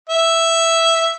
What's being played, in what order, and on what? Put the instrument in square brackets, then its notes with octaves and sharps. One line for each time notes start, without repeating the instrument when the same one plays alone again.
[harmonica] E5